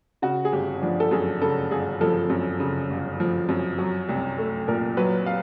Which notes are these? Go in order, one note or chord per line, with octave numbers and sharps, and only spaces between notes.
C#3 F#4
G#4
G1 G4
F3 D4
A4
F#2 G#4
C#3 A4
G1 G#4
F3 A4
F#2
C#3
G1
F3
F#2
F#3
C2
A3
A#2 A#4
F#3 B4
F5